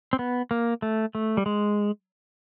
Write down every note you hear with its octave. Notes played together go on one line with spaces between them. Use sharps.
C4
B3
A#3
A3
A3
G3
G#3